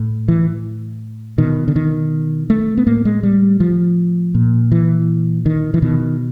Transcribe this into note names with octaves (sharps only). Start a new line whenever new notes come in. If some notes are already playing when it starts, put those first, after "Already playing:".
Already playing: A2
E3
B2 D#3
D3
D#3
A3
B3
A2 A#3
G#3
G3
F3
A#2
E3
D#3
E3
B2 D#3